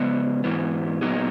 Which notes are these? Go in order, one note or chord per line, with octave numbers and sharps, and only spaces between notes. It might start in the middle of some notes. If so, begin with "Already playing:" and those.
Already playing: C#3 G#3 B3
G#2 E3 B3
A#2 F#3 B3 D#4 G#4